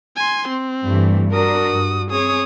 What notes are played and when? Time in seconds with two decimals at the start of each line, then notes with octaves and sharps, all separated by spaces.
0.16 G#5 C6
0.49 C4
0.83 G2 E3 A3
1.33 D4 F#4 A#4 D#6
1.70 G2
2.11 C4 G#4 C#5 D#6